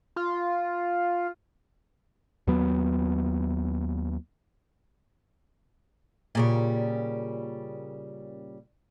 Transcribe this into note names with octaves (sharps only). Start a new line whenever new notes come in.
F4
D#2 F#3 B3
A#2 C#3 G3